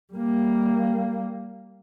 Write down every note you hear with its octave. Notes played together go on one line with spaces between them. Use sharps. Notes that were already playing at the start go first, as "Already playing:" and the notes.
G3 A#3